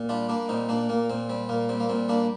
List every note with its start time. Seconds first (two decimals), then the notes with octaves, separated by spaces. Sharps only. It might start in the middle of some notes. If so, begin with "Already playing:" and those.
Already playing: A#2
0.09 G3 D4 F4
0.29 G3 A#3 D4
0.49 A#2 C4 D#4
0.69 A#2 A#3 D4
0.89 A#2 A#3
1.10 A#2 C4
1.29 G3 C4
1.49 A#2 A#3
1.69 G3 C4
1.80 A#3
1.89 A#2 C4
2.09 G3 A#3 D4